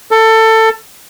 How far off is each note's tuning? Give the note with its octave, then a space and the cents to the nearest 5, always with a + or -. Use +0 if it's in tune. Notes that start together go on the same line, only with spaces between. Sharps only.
A4 +20